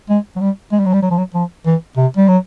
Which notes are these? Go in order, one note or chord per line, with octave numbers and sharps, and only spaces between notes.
G#3
F#3
G3
G#3
G3
F#3
G3
F#3
F3
F#3
F3
E3
C3
G3
F#3